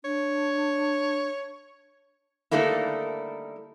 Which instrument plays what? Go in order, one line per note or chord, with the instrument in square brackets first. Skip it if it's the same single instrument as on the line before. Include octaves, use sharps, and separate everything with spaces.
[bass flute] D4 [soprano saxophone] C#5
[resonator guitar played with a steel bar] D3 D#3 G3 A3 A#3 E4